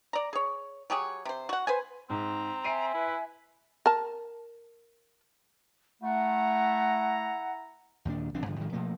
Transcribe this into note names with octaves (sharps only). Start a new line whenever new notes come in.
D5 A#5
G#4 C#5
F#3 G4 G#4 C#5
C3 C5
F#4 F#5
B4 C5 G#5
G#2 C4 A#5
E5 G#5 C7 D7 D#7
E4 B4
A#4 A5
A3 E4 F#5 A#5
D#2 A#2 D#3 D4
B1 E3 C4 D4
G2 D3 F3
A2 D#3 F3 G#3
B2 F3 A3 A#3